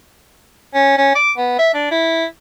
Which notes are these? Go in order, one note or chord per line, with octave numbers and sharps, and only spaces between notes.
C#4
C#4
D6
B3
E5
D4
E4